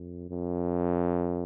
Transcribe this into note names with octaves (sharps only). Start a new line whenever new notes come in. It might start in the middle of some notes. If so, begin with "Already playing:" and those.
Already playing: F2
F2